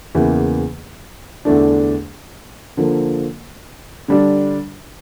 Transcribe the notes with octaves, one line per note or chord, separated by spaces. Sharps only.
E2 C#3 E3 A#3
E2 D3 A3 D4
D3 F3 A#3
D3 G3 D4